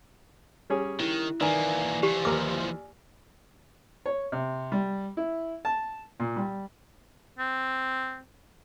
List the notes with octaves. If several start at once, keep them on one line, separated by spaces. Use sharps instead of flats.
G3 C#4 G#4
D#3 E4
D#3 E3 A#3 D5 G#5
E3 F3 G4
D#2 A#4 D6
C#5
C3
G3
E4
A5
A#2
G3
C4